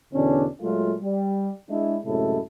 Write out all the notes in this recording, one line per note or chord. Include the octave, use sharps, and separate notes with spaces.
E2 B2 D3 C#4 D4
A#2 F#3 G#3 A3 F4
G3
G#3 D4 E4
F#2 A2 C3 G#3 E4 A4